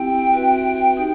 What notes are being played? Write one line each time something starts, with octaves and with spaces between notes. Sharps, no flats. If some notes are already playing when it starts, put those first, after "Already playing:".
Already playing: C4 E4 G4 G5
C4 F#4 B4 E5
D#4 G4